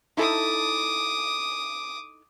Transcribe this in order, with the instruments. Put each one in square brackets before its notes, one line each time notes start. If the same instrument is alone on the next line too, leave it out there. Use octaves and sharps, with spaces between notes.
[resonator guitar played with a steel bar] D#4 E4 A4 [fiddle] D6 D#6